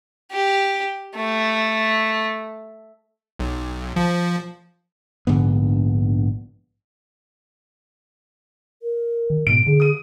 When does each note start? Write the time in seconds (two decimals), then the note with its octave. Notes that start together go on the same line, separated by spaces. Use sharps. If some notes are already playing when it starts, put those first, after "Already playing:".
0.32 G4
1.15 A3
3.39 B1
3.96 F3
5.27 A#1 G#2 D3 B3
8.82 A#4
9.30 D#3
9.47 G#2 B2 D7
9.66 D3 G#4
9.80 D#6 D#7